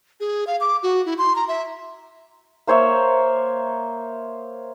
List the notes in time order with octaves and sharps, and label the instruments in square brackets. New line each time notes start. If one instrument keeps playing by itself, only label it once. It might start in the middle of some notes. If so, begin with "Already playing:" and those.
[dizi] G#4
F5
D6
F#4
E4
C6
A#5
E5
[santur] A#3 C5 C#5 E5